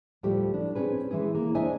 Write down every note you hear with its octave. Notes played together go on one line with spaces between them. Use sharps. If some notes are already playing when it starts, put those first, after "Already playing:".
D2 A2 F3 G3 A3 G4
D4
C4 C#4 G#4 B4
E3 G#3 E4 G#4
A#3
A3 D4 C5 D#5 E5 G#5